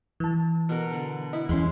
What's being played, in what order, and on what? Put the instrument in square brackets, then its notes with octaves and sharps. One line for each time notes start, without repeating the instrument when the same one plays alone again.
[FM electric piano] E3 A5
[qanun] B2 A#4
D3
[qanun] E4 [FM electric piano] D#5
[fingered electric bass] E2 C#4 [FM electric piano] E3 [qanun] G#3 C6